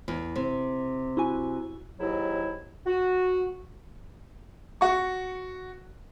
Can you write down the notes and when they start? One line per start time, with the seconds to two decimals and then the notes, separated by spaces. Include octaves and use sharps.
0.08 E2
0.36 C3
1.17 E4 F#4 G#5
2.00 D#2 G#2 F#3 E4
2.86 F#4
4.81 F#4 C#6